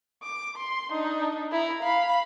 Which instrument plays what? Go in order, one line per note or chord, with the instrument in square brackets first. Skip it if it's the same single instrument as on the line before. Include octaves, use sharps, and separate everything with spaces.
[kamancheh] D6
C6
D4 D#4
E4 A#5
F5 B5